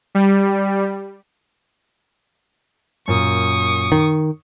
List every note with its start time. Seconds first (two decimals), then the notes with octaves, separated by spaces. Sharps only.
0.15 G3
3.08 F#2 A#2 C#6 D#6
3.92 D#3